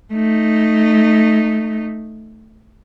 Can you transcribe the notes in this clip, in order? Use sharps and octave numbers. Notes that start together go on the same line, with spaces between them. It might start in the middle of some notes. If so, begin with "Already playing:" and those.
A3 D#4